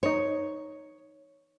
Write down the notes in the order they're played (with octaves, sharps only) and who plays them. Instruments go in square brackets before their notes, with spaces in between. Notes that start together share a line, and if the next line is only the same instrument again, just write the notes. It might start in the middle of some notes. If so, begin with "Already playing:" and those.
[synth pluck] D#4 C5 [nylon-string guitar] C#5